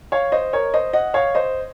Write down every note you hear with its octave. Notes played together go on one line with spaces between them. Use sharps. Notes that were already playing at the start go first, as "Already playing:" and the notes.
C#5 F5
C5 D#5
A#4 C#5
C5 D#5
D#5 F#5
C#5 F5
C5 D#5